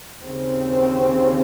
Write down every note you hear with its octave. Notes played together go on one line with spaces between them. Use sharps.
D#2 C#3 C4